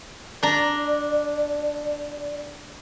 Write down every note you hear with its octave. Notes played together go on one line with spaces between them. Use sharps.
D4 D5 A#5